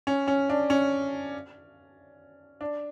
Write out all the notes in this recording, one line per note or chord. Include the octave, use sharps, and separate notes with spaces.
C#4
C#4
D4
C#4
D4